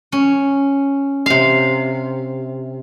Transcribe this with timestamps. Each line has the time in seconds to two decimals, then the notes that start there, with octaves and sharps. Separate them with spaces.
0.12 C#4
1.26 C3 F5